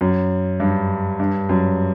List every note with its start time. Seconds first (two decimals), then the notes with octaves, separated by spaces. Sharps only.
0.01 F#2
0.60 G2
1.20 G2
1.49 F#2